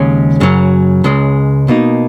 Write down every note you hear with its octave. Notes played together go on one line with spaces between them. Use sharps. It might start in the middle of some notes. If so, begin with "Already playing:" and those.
Already playing: D#2 C#3 G#3 C#4
F#2 C#3 F#3
C#2 C#3 G#3
B2 A#3 D#4